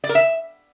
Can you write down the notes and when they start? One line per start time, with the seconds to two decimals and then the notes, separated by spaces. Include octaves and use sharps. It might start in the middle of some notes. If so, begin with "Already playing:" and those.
0.04 D5
0.09 A#4
0.15 E5